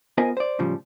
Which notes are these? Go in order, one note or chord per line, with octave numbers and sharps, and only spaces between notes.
B3 F4 A#4 C5 D#5 G#5
C5 D5
A2 C#3 F3 G3